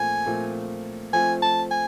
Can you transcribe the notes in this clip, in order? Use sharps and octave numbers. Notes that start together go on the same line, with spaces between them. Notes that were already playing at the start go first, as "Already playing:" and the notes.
Already playing: A#2 F3 A3 C4 G#5
A#2 F3 A3 C4
F3 A3 C4 F4 G#5
A5
G#5